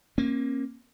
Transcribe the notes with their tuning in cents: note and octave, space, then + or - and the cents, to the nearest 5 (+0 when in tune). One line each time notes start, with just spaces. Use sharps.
A#3 +10 C#4 -40